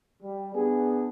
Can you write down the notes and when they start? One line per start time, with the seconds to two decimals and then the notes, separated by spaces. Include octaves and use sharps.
0.23 G3
0.54 B3 D4 G#4